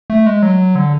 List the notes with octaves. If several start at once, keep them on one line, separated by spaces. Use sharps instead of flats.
A3
G#3
F#3
D3